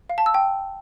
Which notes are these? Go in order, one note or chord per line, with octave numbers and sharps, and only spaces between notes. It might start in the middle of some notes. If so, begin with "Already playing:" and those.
F5
A5
E6
G5